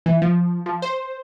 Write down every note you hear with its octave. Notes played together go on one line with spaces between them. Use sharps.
E3
F3
F3
C5